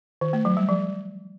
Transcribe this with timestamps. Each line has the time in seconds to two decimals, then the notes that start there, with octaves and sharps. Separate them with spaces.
0.21 D#3
0.33 A3
0.45 F#3
0.57 G3
0.69 F3